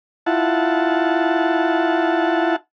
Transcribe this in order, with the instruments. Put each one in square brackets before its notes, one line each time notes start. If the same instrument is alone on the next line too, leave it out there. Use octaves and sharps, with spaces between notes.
[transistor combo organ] E4 F4 F#5 A5